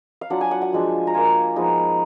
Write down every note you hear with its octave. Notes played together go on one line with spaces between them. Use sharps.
F5
F#3 D4 F4 F#5
G#5
F#5
F#5
F3 G#3 D4
A#5
A#3 F4 G#5
F3 G#3 B3 D#4